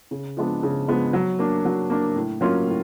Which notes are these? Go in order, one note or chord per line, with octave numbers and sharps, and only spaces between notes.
C#3
F3 G#3 B3 D4
C#3
F3 G#3 B3 D4
F#3
A#3 D4
F#3
A#3 D4
A2
F#3 A#3 C#4 F4
A2